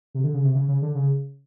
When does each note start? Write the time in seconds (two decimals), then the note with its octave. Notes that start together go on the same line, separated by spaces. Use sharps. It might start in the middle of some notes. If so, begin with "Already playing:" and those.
0.14 C3
0.24 D3
0.34 C#3
0.44 C3
0.55 C#3
0.68 C#3
0.82 D3
0.95 C#3